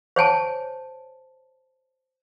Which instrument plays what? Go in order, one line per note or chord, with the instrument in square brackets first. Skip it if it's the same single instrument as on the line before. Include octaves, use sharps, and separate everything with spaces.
[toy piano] C5 C#5 G#5 A5